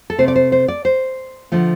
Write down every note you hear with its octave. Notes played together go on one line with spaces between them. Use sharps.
A4
C3 A3 C5
D5
C5
C5
D5
C5
D3 F3 A3